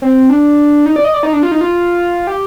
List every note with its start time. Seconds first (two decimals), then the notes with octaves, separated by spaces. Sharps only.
0.02 C4
0.30 D4
0.86 D#4
0.96 D5
1.04 D#5
1.14 D5
1.23 D#4
1.33 D4
1.43 F4
1.52 D#4
1.61 F4
2.27 G4